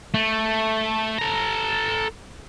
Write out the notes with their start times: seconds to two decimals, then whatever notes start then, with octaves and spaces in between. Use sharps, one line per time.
0.14 A3
1.18 A4 A#5